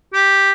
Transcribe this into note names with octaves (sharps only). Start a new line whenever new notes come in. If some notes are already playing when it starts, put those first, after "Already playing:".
G4